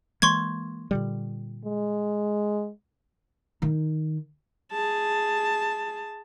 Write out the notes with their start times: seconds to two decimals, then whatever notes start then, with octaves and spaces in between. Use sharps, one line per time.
0.22 E3 G#3 A#3 C6 C#6 G#6
0.91 A#2 D3 G3
1.65 G#3
3.62 D#3 D#4
4.71 G#4 A5